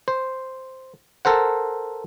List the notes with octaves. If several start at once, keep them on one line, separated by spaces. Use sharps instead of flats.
C5
A4 A#4 C5 F#5